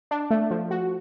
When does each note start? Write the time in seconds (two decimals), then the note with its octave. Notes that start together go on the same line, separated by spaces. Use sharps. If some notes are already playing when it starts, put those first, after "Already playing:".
0.11 D4
0.31 A3
0.51 F3
0.71 F#4